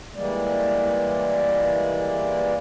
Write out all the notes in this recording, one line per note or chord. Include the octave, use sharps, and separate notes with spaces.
E3 G3 G#3 A#3 D5